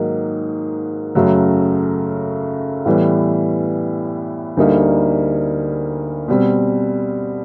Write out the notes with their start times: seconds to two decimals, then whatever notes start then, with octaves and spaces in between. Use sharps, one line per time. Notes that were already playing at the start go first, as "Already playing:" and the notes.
Already playing: G#2 D#3 F#3 A#3 D#4
1.15 F#2 C#3 F#3 A3
2.86 A2 E3 G3 B3
4.57 D2 D3 G3 A#3 D#4
6.28 B2 G3 C4